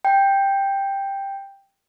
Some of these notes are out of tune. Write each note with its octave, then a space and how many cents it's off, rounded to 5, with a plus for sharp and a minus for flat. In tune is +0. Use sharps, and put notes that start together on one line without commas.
G5 +5